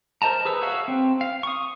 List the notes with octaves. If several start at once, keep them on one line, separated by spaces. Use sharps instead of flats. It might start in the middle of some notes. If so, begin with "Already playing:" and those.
A#4 C5 D#5 A5 A#5
G#4 B4 E6
F#4 C#5 E5 F5 E6
C4
F5
C#6 D#6